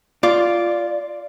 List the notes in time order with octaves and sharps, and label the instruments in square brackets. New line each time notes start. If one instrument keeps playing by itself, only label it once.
[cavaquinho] F4 D6 [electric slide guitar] D5